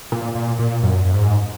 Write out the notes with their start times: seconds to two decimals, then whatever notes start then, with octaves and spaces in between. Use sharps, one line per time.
0.12 A#2
0.35 A#2
0.59 A#2
0.83 F#2
1.05 F#2
1.14 G#2